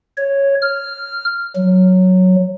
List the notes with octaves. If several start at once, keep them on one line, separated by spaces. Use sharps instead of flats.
C#5
F6
F#3